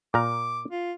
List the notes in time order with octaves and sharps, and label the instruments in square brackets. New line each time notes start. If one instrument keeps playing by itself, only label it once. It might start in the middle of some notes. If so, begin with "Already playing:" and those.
[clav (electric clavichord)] A#2 A#4 [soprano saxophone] D6
[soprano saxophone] F4